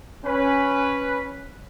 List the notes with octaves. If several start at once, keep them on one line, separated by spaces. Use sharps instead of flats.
C#4 B4